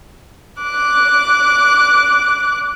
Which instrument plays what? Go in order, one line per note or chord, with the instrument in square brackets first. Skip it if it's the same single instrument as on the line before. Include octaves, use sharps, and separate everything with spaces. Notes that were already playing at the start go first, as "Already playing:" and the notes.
[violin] D6 F#6